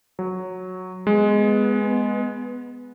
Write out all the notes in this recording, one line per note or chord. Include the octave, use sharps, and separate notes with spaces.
F#3
G#3 B3